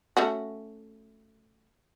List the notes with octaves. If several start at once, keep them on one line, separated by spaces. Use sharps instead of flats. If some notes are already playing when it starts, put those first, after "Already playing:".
A3 C#4 F#4